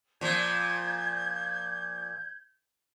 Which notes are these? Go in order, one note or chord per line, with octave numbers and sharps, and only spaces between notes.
A#2 F3 G6 G#6